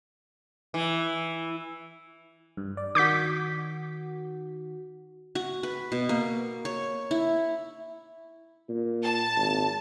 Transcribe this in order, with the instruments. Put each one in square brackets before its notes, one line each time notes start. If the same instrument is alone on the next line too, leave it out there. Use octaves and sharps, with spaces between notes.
[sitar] E3
[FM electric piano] G2
D5
[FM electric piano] D#3 F#4 [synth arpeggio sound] D6 G6 B6
[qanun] F#4
B4
B2
A#3
C#5
E4
[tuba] A#2
[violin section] A5
[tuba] G#1